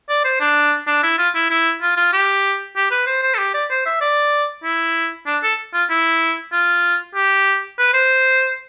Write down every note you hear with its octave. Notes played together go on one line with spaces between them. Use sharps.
D5
C5
D4
D4
E4
F4
E4
E4
F4
F4
G4
G4
B4
C5
C5
A4
G4
D5
C5
E5
D5
E4
D4
A4
F4
E4
F4
G4
B4
C5